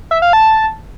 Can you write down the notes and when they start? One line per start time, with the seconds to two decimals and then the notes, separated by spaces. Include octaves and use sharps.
0.11 E5
0.22 F5
0.33 A5